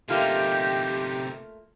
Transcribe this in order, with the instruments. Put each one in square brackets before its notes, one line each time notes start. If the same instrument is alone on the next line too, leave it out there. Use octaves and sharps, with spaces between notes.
[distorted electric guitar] C3 D#4 [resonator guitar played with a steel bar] A3 A#3 F4 [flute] G4